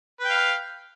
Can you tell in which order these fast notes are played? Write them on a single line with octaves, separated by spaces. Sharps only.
B4 G5 F5